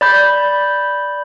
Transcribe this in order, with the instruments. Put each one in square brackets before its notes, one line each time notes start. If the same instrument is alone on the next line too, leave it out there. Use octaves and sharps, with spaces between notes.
[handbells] D5 B5 G6